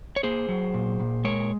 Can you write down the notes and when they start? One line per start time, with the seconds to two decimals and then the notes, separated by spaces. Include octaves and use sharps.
0.16 C#5
0.23 A#3 G#4 C5
0.49 F#3
0.74 A#2
1.00 A#2
1.25 G#3 A#4 C#5